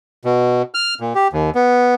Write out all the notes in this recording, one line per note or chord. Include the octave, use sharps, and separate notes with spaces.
B2
F6
A#2
G4
D#2
B3